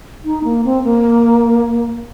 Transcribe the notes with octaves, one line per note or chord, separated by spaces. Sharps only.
D#4
A#3
C4
A#3